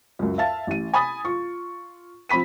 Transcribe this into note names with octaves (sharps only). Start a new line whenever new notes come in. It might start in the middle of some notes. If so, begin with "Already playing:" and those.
C#2 F#2
E5 F5 A5 A6
A1 D#7
G#5 B5 D#6 A6
F4 C#6
F3 C4 B5 B6 D#7